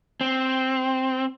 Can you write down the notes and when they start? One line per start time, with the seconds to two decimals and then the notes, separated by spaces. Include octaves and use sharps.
0.21 C4